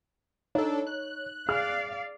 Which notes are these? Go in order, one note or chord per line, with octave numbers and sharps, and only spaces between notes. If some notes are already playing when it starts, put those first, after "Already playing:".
D4 D#4 A4 C#5
F#6
G#4 D5 F5 F6